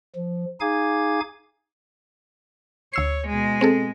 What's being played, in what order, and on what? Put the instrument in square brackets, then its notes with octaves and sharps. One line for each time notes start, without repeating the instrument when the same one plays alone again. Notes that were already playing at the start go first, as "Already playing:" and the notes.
[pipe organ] F3
D#4 G#4 F5 G#5 D6 G#6
[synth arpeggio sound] D2 E6 C7 [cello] C#5
[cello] B2 G#3
[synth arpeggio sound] C4 G#4 A4